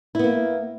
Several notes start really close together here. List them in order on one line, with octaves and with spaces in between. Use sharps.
E4 B3 A#3